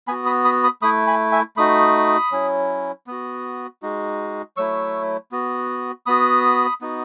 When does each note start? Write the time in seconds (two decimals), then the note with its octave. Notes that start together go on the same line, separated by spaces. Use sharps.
0.07 B3 G#5 B5
0.11 F#4
0.26 B5 D#6
0.45 B5 D#6
0.64 B5 D#6
0.82 A3 E4 B5 D#6
1.07 G#5 B5
1.32 E5 G#5
1.57 A3 D#4 F#4 B5 D#6
2.32 F#3 C#4 E4
3.07 B3 F#4
3.82 G#3 D#4 F#4
4.57 F#3 A3 E4 C#6 E6
5.32 B3 F#4
6.06 B3 F#4 B5 D#6
6.81 B3 D#4 F#4